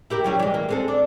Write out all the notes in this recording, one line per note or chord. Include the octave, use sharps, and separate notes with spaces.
E4 G4 A#4
F#3 G3 C#4
E3 G#3
A#3
G#3 C4 A4
D4